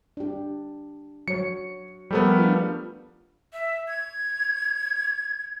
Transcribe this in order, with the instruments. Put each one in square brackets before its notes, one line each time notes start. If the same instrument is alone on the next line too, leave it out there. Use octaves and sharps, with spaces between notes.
[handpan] D4 G4
[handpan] F#3 C#5 [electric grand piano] C#7
[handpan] F3 A4 A#4 [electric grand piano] G3 A3 B3
[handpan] D4 F4
[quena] E5
G#6